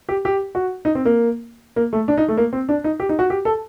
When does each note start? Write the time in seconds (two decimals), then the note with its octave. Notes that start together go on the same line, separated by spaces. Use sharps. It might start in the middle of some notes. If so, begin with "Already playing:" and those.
0.09 G4
0.25 G4
0.55 F#4
0.85 D#4
0.95 C4
1.05 A#3
1.76 A#3
1.93 A3
2.08 D4
2.18 D#4
2.28 A3
2.37 A#3
2.53 C4
2.69 D4
2.84 D#4
3.00 G4
3.09 D#4
3.19 F#4
3.30 G4
3.45 A4